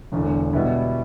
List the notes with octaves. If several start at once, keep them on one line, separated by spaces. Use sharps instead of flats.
E1 E2 D3
B2 G3 B3 E4